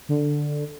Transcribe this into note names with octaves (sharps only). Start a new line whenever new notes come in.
D3